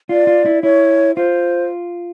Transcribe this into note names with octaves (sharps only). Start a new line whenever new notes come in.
F4 D5
F4
E4
E4 C#5
F4 C5